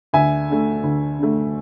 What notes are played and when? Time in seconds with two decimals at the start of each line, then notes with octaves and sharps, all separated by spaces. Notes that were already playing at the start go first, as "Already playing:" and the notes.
0.13 D2 E5 G#5
0.49 D3 A3
0.83 D2
1.19 D3 A3